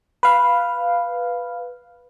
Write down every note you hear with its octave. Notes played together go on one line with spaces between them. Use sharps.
B4 F5